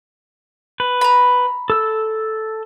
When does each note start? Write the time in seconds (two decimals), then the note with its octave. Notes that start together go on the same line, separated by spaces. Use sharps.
0.80 B4
1.01 A#5 B5
1.70 A4 E6